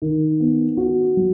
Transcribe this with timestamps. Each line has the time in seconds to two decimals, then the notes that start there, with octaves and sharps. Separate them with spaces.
0.02 D#3
0.40 B3
0.77 F#4
1.17 F#3